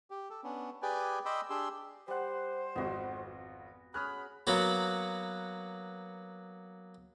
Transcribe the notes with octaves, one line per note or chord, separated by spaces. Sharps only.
G4
A4
B3 C#4 D4
G4 G#4 B4 D5 G5 G#5
D#5 G5 B5 C6 D6 E6
D4 G4 G#4 C6 E6
G3 C5 F#5
G#1 F2 B3 F#4
C#4 G#4 C#5 B5 D#6 F6 F#6
F#3 A#3 B3 F#4